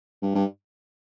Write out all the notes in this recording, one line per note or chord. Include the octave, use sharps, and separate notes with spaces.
G2
G2